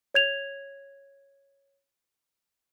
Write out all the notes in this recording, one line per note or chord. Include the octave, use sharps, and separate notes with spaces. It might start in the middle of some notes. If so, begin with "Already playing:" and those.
C#5 G#6 F7